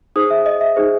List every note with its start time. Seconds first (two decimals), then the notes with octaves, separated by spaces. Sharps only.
0.16 D#4 G#4 C5 D#6
0.30 E5
0.46 D#5
0.61 E5
0.76 D#4 G#4 C5